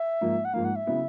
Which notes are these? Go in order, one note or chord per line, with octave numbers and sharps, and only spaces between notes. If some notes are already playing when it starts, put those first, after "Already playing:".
Already playing: E5
G#2 F3 A#3
F#5
G#2 F3 A#3 F5
F#5
E5
C#3 F#3 B3 E4